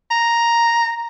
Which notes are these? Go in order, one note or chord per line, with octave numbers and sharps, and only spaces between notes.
A#5